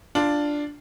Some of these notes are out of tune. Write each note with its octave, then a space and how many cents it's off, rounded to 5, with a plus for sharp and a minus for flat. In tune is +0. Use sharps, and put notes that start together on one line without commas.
D4 +0 F4 -5